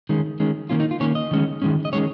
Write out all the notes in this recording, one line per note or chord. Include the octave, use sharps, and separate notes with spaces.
D#3 G#3 C#4
D#3 G#3 C#4
D#3 A#3 C#4 F4
D#4
F4
D#3 A#3 C#4 C#5
D#5
D#3 G#3 C#4
D#3 G#3 C#4
D#5
D#3 G#3 C#4 C#5